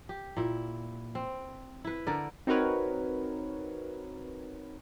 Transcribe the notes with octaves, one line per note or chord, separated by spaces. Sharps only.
G4
A#2 E4
C4
E4 B4
D3 A#4 D5
C4 D#4 F#4 A#4 B4 C#5